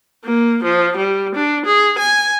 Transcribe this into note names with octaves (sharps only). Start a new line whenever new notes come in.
A#3
F3
G3
D4
G#4
G#5